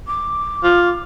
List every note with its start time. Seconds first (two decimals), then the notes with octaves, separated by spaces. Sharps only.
0.07 D6
0.64 F4